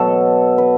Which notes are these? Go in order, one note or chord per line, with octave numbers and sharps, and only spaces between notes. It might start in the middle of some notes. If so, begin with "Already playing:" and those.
Already playing: B2 F#3 A4
B4